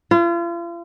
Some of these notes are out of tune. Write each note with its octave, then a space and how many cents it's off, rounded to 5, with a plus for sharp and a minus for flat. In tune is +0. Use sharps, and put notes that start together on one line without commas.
F4 -40